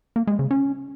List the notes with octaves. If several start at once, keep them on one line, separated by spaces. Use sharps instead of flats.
A#3
G#3
C#3
C#4